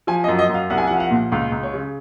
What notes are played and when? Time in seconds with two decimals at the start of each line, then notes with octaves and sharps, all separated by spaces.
0.07 F3 G#5
0.24 D#5
0.28 F#2
0.39 D#5
0.49 F#2
0.54 F5
0.70 C2 F#5
0.78 G#5
0.87 F#5
0.90 F3
0.97 F5
1.00 F#5
1.11 A#2
1.32 C#2 F5
1.52 C#2
1.63 C#5
1.74 C#3